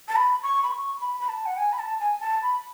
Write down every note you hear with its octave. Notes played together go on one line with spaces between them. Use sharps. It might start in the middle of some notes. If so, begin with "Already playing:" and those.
A5
B5
C#6
B5
C#6
B5
B5
A5
F#5
G#5
B5
A5
G#5
A5
B5